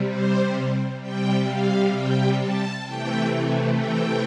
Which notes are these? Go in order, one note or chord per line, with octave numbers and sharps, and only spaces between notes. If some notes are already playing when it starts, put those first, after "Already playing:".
Already playing: C3 G3
C5
C3 G3 G5
F5
G5
A5
C3 E3 A3 G5
G5